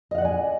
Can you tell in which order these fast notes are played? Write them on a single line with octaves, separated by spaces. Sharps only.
D#5 F5 F#5 D5 G#5